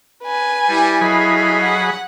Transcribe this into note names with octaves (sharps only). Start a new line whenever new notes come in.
B4 G#5
G3 E4
F#3 G#4 A4 D#5 F5 B5
F#5